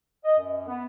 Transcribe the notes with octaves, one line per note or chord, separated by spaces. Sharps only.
D#5
F#2
B3